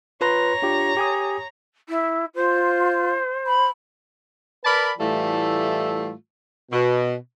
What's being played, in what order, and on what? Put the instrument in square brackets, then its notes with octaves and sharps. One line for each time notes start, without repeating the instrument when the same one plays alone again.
[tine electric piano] F4 B4 C6 [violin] C#5 A#5
[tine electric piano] D4 F4 G4
G4 G#5 D#6
[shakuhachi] E4
[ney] F4 [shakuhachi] C5
[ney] B5
[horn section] A#4 B4 D5 A5 B5
A2 E3 G3 A3 F4 A4
B2